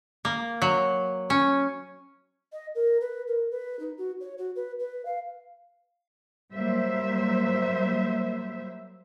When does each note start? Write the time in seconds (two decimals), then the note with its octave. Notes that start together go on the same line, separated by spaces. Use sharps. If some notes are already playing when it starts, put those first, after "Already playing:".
0.25 A#3
0.62 F#3
1.30 C#4
2.52 D#5
2.75 A#4
3.01 B4
3.27 A#4
3.51 B4
3.79 D#4
3.98 F#4
4.21 C#5
4.38 F#4
4.56 B4
4.79 B4
5.05 F5
6.53 F#3 G3 A#3 C5 E5